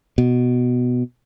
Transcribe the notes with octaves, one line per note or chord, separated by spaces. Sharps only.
B2